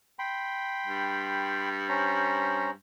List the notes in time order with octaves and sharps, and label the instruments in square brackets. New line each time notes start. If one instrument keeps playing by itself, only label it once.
[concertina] G5 B5 C6
[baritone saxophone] G2
[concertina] C#4 C5 A#5